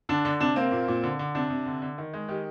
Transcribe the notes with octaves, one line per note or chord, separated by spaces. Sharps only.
D3 D4
D3
C3 D4
A#3 C4
A#2
A#2
D3
D3
C3 D4
C3
D3
D3
D#3
G#3
D#3 G4